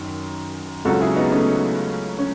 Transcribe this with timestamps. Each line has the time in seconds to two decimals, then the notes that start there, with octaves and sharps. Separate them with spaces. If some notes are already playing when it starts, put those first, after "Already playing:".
Already playing: F#2 D#3
0.85 C#2 C#3 F#3 F#4 A4
1.01 E4 G#4
1.16 B3 D#4
1.31 A3 C#4
2.19 C#4